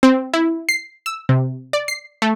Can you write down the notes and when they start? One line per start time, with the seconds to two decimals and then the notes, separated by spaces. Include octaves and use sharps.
0.03 C4
0.34 E4
0.69 C7
1.06 E6
1.29 C3
1.73 D5
1.88 C7
2.22 A3